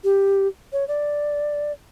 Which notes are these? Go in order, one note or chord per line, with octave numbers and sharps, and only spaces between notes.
G4
C#5
D5